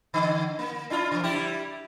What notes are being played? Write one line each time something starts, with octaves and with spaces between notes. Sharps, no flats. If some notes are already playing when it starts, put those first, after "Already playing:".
D3
A#3
D4 E4 F4
C#3 F3
G3 E4 G4